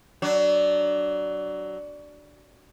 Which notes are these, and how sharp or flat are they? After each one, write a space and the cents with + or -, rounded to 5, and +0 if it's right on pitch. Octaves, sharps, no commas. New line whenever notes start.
F#3 +20 D4 +0